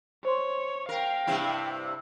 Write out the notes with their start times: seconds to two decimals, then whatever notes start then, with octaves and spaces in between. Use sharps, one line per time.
0.25 C5 C#5 C6
0.89 A#4 F5 G5
1.27 G2 C3 E4